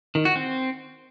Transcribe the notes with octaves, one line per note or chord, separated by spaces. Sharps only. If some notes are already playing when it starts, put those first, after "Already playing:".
D#3
F#4
C4